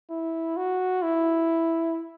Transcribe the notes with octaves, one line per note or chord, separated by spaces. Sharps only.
E4
F#4
E4